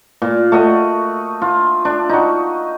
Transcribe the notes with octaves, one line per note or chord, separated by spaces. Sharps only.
A#2
A3 F#4 D#5
F4
D4
D#4 F#4